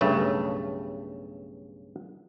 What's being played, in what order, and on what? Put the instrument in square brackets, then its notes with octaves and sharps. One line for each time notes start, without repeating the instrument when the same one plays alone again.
[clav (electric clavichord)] B1 G2 C#3 A3